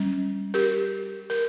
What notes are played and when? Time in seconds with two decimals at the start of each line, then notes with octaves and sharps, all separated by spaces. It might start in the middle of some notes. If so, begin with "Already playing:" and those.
Already playing: G3 C#4
0.54 G4 A#4
1.30 A#4